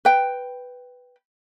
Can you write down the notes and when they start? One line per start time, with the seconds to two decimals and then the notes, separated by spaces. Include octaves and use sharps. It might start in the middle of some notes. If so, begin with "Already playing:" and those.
0.05 B4 G5